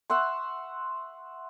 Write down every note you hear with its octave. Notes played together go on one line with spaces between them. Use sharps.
E5 F#5 C6 C#6